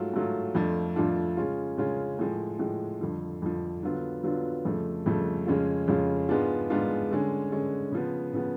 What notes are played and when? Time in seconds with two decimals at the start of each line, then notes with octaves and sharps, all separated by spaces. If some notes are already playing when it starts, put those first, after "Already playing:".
Already playing: G#2 F#3 A3 F4
0.14 G#2 F#3 A3 F4
0.55 F2 F3 A3 D4 F4
0.96 F2 F3 A3 D4 F4
1.37 C#3 G#3 C#4 F4
1.78 C#3 G#3 C#4 F4
2.19 A2 F3 G#3
2.59 A2 F3 G#3
3.01 F2 D3 F3
3.42 F2 D3 F3
3.83 D3 F#3 B3 F4
4.24 D3 F#3 B3 F4
4.65 F2 C#3 F3 A3
5.06 F2 C#3 F3 A3
5.47 F2 C#3 G#3 C#4 F4
5.88 F2 C#3 G#3 C#4 F4
6.29 G#2 G#3 B3 D4 F4
6.70 G#2 G#3 B3 D4 F4
7.11 D3 G#3 C#4
7.52 D3 G#3 C#4
7.92 C#3 F3 B3
8.33 C#3 F3 B3